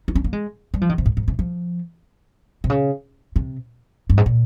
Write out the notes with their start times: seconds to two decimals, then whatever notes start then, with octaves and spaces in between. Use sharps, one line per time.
0.08 D#4
0.15 C#4
0.24 A#3
0.33 G#3
0.74 G3
0.81 F3
0.89 D#3
0.98 C3
1.06 G#2
1.17 G#2
1.28 C3
1.39 F3
2.64 C3
2.70 C#3
3.36 C3
4.10 G2
4.18 G#2
4.26 A#2